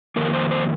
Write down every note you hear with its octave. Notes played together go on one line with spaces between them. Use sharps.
F2 D#3 A#3 A#4
C5
C5